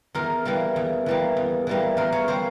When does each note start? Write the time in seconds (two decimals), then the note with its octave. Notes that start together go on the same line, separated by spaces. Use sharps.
0.14 E2 A#4
0.45 E3 G3 A#3
0.76 E2
1.06 E3 G3 A#3
1.37 E2
1.67 E3 G3 A#3
1.97 E2 A#4
2.12 C#5
2.28 E3 G3 A#3 C5